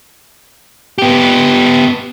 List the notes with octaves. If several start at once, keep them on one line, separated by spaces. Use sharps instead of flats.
B3 G4